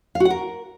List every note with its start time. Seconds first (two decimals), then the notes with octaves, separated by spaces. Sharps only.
0.15 F5
0.20 F#4
0.25 F#5
0.30 A#4